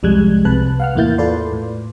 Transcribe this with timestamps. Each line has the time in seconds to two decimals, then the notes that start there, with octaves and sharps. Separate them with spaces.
0.03 C2 F2 G3 G#3 F#6 G#6
0.45 C2 C3 B4 A5 F#6
0.80 F5 F#5 F6
0.95 E2 A2 A#3 E4 G6 A6
1.18 F4 A4 B4 D5 C6
1.53 A2